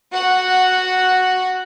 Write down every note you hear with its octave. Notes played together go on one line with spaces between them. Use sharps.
F#4 F#5